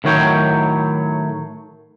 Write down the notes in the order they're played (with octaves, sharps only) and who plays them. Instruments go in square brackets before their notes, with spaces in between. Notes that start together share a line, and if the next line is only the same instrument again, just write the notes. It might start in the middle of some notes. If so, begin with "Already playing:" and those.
[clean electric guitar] A2 D#3 F#3 C#5 G5